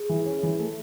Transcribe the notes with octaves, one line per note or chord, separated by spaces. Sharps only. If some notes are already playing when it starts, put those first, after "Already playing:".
Already playing: G#4
E3
C#4
E3
A3